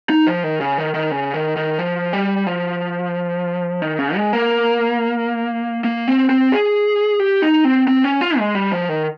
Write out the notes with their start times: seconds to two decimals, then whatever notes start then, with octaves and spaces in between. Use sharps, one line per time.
0.10 D#4
0.27 F3
0.44 D#3
0.61 C#3
0.78 D#3
0.94 D#3
1.11 C#3
1.34 D#3
1.56 D#3
1.79 F3
2.13 G3
2.47 F3
3.82 D#3
3.99 C#3
4.16 G#3
4.33 A#3
5.84 A#3
6.08 C4
6.29 C4
6.52 G#4
7.20 G4
7.42 D#4
7.64 C4
7.87 C4
8.04 C#4
8.21 F4
8.38 G#3
8.55 G3
8.72 F3
8.89 D#3